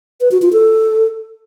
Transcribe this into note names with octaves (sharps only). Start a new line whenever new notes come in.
B4
F#4
F4
A4